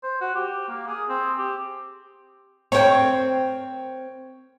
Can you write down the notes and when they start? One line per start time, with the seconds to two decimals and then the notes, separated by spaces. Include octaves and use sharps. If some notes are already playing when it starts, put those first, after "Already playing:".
0.03 C5
0.21 F#4
0.35 G4
0.69 A#3
0.87 G#4
1.09 C4
1.38 G4
2.72 C4 A#4 C#5 G5